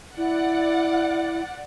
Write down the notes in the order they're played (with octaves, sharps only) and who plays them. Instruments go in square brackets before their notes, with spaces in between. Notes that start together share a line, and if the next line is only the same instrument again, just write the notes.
[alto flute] E4 [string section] D5 F#5